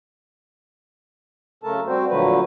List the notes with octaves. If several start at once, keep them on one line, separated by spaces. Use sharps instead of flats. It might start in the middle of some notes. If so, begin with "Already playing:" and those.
F#2 C#3 A3 A4 A#4 A5
G3 C4 F#4 C5
A#2 D3 F3 F#3 A3 B4